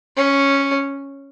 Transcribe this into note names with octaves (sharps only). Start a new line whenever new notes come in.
C#4